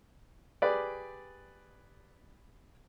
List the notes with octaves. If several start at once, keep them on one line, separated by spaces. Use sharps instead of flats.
G4 G#4 B4 D5